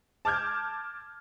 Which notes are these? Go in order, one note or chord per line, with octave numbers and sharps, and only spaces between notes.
A5 D6 F6 G6 G#6